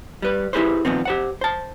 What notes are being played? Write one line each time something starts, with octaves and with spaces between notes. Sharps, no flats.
G3 B4
E4 G4 G#4 B4 C5
A#2 D#3 F3 B3 C4
G4 C5 F#5
C5 A5